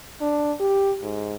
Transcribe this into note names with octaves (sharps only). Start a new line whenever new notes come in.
D4
G4
G#2